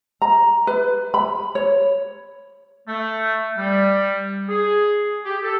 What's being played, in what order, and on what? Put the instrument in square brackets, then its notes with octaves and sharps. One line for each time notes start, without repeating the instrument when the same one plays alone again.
[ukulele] A#5
B4
B5
C#5
[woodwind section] A3
G3
G#4
G4
A4